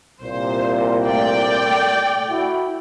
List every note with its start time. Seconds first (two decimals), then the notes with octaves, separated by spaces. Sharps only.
0.21 C2 A#2 C5
1.06 A3 D5 G5
2.29 E4 F#4